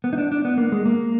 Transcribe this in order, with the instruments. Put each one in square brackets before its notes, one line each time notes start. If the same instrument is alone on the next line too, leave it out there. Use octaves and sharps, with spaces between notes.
[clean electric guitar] B3
D#4
D4
D4
B3
A#3
G#3
A#3